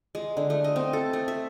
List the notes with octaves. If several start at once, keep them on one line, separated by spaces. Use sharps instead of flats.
G#3
D3
A3
D#5
C4
A4
A3
E5